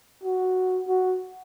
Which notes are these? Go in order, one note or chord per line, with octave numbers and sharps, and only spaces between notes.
F#4
F#4